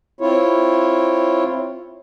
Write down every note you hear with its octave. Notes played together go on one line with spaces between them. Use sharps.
C4 E4 F4 C#5